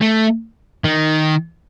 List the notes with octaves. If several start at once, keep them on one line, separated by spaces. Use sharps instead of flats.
A3
D#3